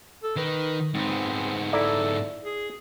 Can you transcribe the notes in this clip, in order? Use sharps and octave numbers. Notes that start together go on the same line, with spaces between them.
A4
D#3 B4
G#2 B3 C4
E4 A4 D5 A#5
G#4